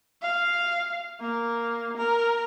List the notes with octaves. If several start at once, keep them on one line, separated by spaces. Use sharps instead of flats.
F5
A#3
A#4